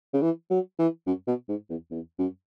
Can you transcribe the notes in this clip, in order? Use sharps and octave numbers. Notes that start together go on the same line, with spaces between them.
C#3
E3
F#3
E3
F#2
B2
G#2
E2
E2
F#2